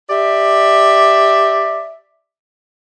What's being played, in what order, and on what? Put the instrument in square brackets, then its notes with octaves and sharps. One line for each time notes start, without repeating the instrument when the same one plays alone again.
[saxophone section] G4 D5 E5